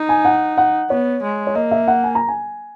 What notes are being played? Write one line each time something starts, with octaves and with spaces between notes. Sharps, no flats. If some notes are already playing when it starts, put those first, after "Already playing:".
Already playing: D#4
G#5
F#5
F#5
B3 C#5
G#3
C#5
A#3 D#5
E5
F#5
G#5
A#5
G#5